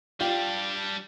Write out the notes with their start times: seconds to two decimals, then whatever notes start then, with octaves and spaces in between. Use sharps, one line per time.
0.20 G3 D4 F4 G4